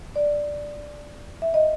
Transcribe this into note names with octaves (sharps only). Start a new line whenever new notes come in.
D5
E5
D#5